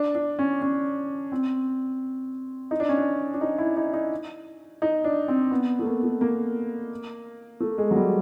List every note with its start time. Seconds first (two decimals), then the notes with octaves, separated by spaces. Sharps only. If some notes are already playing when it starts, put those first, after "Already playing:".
Already playing: D4
0.15 D4
0.39 C#4
0.62 C#4
1.32 C4
2.71 D#4
2.80 D4
2.89 C#4
2.97 D4
3.33 D4
3.41 D#4
3.58 E4
3.77 D#4
3.94 D#4
4.82 D#4
5.04 D4
5.28 C4
5.51 B3
5.79 A3
5.86 A#3
6.03 A3
6.21 A#3
7.60 A3
7.78 G#3
7.91 F#3
7.96 G3